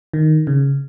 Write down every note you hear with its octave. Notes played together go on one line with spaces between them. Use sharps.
D#3
C#3